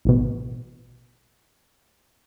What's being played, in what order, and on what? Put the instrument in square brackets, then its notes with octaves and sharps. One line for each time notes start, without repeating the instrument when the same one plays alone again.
[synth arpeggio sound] A1 B2